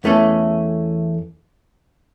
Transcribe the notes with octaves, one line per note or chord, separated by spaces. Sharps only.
E2 E3 A3 C#4 A4